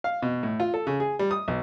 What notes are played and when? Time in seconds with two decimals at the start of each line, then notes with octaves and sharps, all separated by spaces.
0.04 F5
0.22 B2
0.43 A2
0.60 F4
0.74 A4
0.87 C#3
1.00 G#4
1.19 G3
1.31 D#6
1.48 B1